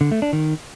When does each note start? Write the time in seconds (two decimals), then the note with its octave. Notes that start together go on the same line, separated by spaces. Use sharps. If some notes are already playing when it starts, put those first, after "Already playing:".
0.01 D3
0.11 A3
0.22 D4
0.33 D#3